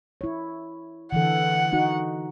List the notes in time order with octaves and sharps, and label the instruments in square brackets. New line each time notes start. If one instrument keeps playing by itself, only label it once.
[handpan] E4 C#5
[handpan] D3 E3 A4 [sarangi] F#5
[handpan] D#4 F#4